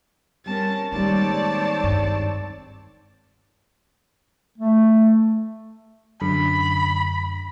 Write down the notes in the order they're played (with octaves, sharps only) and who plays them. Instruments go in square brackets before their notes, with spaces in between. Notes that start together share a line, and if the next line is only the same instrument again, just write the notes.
[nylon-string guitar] G3 [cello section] C4 C#4 A#4 [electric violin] A5
[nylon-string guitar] D#3 G3 [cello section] G#3 C#5 D5 [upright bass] A#3 [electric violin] C4 A5
[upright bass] G2
[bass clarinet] A3
[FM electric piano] F#2 D3 [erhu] B5